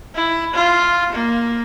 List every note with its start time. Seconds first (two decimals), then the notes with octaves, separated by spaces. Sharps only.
0.15 E4
0.54 F4
1.12 A#3